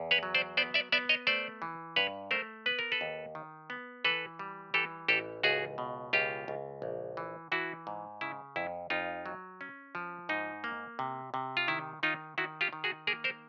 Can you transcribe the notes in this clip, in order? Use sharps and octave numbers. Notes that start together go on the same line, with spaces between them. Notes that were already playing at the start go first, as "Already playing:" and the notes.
Already playing: E2
B4 C#5
F#3
C5 D5
B3 C5 D5
D5 E5
B3 D5 E5
C#5 D#5
A3 C5 D5
E3
G2 B4 C#5
A3 A#4 C5
B3 B4
A#4
A4 B4
D#2
D#3
B3
E3 A4 B4
G3
E3 G4 A4
A1 G4 A4
C#2 F#4 G#4
B2
C#2 F4 G4
C#2
A#1
E3
E3 E4 F#4
G#2
C#3 E4
F2 E4
F2 D#4 F4
F#3
C#4
F3
G#2 D#4
A#3
C3
C3
F4
D#3 E4
D#3 D#4 F4
D#3 E4 F#4
F4 G4
D#3
F#4 G#4
A#3 G#4 A#4
A#4 C5